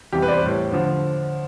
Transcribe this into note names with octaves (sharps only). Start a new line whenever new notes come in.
E2 C3 E3 G3 G4
B4
D5
C5
A2 G3
D3 F3